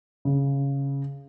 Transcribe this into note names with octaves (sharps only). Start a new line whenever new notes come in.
C#3